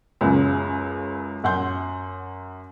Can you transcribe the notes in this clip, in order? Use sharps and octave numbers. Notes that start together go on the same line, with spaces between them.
C#2 F#2 C#3
F#2 F#5 C6 G6